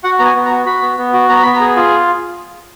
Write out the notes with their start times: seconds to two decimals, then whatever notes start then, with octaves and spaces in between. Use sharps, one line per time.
0.04 F#4 F#5
0.19 B3 A#5
0.25 G#5
0.35 B3
0.45 A#5
0.50 F#4
0.66 F#4 B5
0.82 B3
0.98 B3
1.13 F#4
1.29 B3 A#5
1.43 B3 B5
1.56 G#4 A#5
1.76 F4